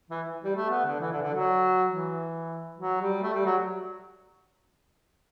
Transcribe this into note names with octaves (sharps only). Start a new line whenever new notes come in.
E3
G3
A3
B3
D3
E3
D3
D3
F#3
E3
F#3
G3
A3
G3
F#3